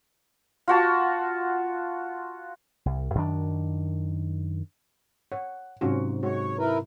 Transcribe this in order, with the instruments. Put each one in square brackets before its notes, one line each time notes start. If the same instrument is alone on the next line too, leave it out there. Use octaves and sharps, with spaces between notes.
[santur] F4 F#4 A5
[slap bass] C2
F#2 D#3 D4
[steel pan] C#5 [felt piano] F#5
[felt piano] G#2 C3 F#3 [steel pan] C#4 F4 F#4
[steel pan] G#3 F#4 [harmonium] C#5
[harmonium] E4 A#4 B4